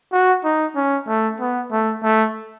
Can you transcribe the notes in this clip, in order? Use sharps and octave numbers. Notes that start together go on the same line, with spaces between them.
F#4
D#4
C#4
A3
B3
A3
A3